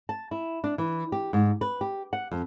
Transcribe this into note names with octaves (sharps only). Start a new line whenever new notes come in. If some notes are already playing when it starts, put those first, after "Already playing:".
A5
E4
D4
E3
G4
G#2
B4
G4
F#5
F2